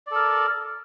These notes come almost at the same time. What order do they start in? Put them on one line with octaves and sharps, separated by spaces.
D5 A4 A#4